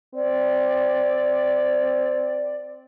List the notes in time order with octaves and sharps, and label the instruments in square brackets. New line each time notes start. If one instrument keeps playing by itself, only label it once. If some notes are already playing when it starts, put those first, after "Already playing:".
[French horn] C4 [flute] D5